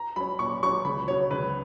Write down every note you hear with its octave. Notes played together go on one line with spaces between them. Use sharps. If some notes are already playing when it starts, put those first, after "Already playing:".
Already playing: A#5
F#3 C#4 B5
A#2 C#6
F#3 C#4 C#6
C#2 B5
B2 F#3 C#5
C#2 B4